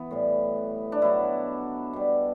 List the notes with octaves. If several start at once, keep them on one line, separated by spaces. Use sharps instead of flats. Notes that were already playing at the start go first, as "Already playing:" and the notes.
Already playing: E3 B3
A2 G3
D4
B2 F#3 E4
B2 G3